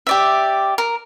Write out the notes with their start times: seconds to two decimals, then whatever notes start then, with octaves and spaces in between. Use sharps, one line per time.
0.07 G4 D5 E5
0.78 A#4